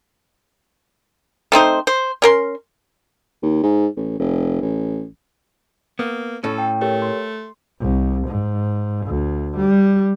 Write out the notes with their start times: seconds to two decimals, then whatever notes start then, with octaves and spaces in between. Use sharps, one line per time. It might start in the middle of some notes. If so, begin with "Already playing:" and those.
1.52 A3 C4 D#4 C5
1.87 C5
2.22 C#4 A#4 C6
3.42 D#2
3.63 G#2
3.97 A1
4.19 F1
4.61 A1
5.99 A#3 B3
6.44 A2 C#4 A4
6.58 G5
6.81 A3 G4 A#4 C#5
7.02 C6
7.80 C2
8.27 G#2
9.06 D2
9.57 G3